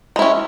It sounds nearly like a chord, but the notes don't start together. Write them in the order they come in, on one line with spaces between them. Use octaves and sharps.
G#3 E4 C#4